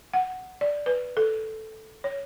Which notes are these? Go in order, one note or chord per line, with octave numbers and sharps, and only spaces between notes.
F#5
D5
B4
A4
C#5